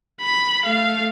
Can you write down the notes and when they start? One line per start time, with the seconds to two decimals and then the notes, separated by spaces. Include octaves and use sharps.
0.21 B5
0.65 A3 F5